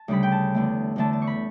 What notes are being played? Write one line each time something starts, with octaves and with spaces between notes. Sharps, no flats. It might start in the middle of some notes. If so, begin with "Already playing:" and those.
Already playing: A5
D2 C#3 G3 B5
G5
A5
E2 D3 A3
E2 D3 A3 A5
A5
C#6
B5